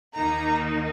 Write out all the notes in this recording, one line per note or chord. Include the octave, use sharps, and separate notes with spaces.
D#2 D#3 A#3 D#4 A#5